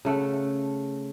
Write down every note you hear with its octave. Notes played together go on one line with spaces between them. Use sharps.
C#3 A3 F#5